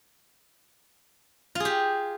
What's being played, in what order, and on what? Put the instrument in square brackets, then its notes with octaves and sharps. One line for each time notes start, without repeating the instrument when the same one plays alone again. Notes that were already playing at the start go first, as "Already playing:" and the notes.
[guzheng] F4
G#4
G4